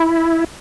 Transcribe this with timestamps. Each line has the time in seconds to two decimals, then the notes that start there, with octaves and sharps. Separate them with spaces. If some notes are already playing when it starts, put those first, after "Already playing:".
Already playing: E4